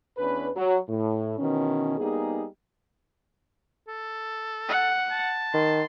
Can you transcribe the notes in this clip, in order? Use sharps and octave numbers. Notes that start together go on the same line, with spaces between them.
E2 C#4 D4 B4
F#3
A2
B2 D#3 E3 C#4
G3 A#3 B3 D#4 G#4
A4
F#5
A5
D#3 C6